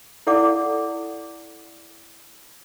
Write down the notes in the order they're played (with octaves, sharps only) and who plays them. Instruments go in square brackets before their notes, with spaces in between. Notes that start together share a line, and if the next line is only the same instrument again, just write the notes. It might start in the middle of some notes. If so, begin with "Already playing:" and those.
[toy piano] E4 A4 D5 F#5 D6